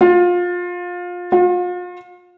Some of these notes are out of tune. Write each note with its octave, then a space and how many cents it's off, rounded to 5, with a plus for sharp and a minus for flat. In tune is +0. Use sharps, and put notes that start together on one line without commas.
F4 +25
F4 +40